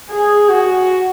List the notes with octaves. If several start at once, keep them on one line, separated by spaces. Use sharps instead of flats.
G#4
F#4